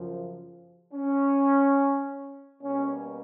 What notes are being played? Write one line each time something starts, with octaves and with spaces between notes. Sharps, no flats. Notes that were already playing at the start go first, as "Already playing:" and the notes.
Already playing: F#2 C#3 F3
C#4
B2 G3 A#3 C#4